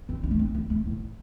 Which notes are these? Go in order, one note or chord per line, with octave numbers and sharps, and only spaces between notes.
C4
D4
A3
C4
C4
A3
A2